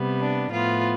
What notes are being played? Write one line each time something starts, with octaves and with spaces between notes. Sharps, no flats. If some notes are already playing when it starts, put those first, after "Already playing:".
Already playing: C3 G3 B3
D4
A2 F3 B3 F4